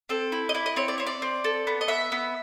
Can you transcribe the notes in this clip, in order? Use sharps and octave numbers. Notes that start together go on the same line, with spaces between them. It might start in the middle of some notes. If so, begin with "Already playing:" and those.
C4 A4
E4
D#5
E4 D5
D#5
C4 C#5
D5
C4 C#5
D5
C4
A4
B3
D#5
B3 E5
B3